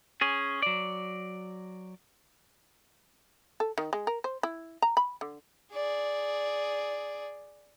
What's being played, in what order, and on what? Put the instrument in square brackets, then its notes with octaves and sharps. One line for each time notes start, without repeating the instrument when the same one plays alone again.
[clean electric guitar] C#4 G#4
F#3 D5
[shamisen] A4
D#3
G#3
A#4
C5
E4
A#5
B5
D3
[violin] G#4 D5